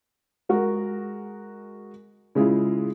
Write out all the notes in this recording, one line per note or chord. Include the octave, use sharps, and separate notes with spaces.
G#3 F#4 A#4
C#3 G#3 E4 F4